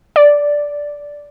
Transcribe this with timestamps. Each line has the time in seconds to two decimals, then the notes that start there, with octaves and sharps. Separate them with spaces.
0.16 D5